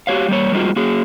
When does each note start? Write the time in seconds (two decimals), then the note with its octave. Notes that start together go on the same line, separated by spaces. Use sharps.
0.07 F#4 G4 C#5 F5
0.29 G3 A#3 C#5
0.52 G3 G#3 A#3 D#4 F4 F#4
0.76 A#3 F#4 G#4